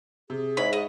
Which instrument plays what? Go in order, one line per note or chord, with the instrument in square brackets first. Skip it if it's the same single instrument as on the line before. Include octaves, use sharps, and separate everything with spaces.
[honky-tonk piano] C3 [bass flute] G#4
[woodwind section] G#2 [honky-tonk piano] E4 C#5 B6 [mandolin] B5
[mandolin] D#5